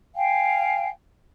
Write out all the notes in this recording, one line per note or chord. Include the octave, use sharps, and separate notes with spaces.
F5 G5 G#5